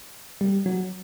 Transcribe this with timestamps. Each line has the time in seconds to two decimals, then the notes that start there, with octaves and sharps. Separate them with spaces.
0.41 G3
0.66 F#3